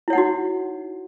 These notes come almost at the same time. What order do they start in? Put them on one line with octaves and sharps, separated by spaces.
E4 C#5 F#5 D#4 F#4